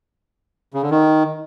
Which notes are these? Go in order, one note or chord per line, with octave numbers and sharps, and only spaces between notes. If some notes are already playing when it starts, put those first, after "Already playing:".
C#3
D3
D#3